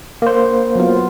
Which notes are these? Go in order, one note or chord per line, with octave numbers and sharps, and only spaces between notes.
A#3 C5
F#3 B3 F4